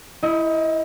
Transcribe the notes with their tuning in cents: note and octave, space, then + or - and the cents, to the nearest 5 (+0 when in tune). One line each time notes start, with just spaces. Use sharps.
E4 +0 D#5 +25